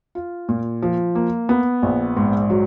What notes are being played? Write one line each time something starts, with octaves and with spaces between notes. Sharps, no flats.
F4
A#2
F3
A#3
B3
A#1
G#2
F#3